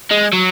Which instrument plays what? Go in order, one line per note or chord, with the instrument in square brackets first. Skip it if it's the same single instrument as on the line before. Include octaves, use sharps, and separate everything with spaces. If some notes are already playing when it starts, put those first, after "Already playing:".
[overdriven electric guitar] G#3
F#3